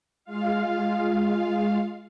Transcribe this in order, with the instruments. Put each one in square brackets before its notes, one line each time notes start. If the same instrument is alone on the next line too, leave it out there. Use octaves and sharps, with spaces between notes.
[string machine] G#3 F4 F5